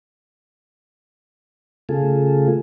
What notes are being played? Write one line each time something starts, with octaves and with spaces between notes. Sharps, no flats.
C#3 A3 F4 G#4 A4